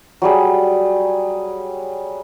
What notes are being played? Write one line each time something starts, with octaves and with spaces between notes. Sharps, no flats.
F#3 G3 G#4